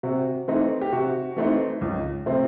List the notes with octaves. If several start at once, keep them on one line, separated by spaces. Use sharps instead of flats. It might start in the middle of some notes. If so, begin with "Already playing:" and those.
C3 F#4
E3 A3 C4 D#4
G4
C3 F#4
E3 A3 C4 D#4
C#2
C3 F3 A3 C4